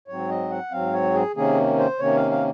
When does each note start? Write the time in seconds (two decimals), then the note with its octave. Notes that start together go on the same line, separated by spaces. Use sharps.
0.08 G#2 F#3 C4 C#5
0.29 D#5
0.50 F#5
0.71 G#2 F#3 C4 F5
0.93 C#5
1.14 G#4
1.36 C3 D#3 A#3 C#4 G#4
1.78 C5
1.99 C3 D#3 A#3 C#4 C#5
2.16 F5
2.31 F5